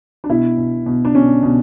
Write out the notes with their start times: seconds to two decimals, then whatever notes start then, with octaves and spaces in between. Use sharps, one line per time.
0.24 D4
0.29 B2 E4
0.57 B2
0.86 B2
1.05 D4
1.15 B2 C#4
1.43 B2